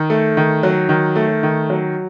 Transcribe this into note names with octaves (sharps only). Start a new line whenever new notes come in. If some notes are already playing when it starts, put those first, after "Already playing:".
Already playing: D#3
A3
D#3
F#3
D#3
A3
D#3
F#3